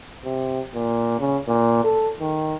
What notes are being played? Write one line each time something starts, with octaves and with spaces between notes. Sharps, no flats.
C3
A#2
C#3
A#2
A4
D#3